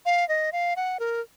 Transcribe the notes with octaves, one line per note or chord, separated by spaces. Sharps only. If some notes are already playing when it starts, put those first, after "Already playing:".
F5
D#5
F5
F#5
A#4